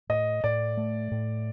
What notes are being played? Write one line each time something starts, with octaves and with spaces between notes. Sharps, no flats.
A2 D#5
A2 D5
A3
A2